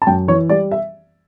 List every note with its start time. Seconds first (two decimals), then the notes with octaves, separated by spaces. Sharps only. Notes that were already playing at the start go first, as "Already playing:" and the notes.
0.02 A5
0.07 F#2 G5
0.28 E3 C#5
0.49 G3 D5
0.71 E5